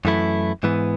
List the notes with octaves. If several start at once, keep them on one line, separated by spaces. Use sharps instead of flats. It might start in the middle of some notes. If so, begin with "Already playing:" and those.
F#2 E3 A3 E4
G#2 E3 B3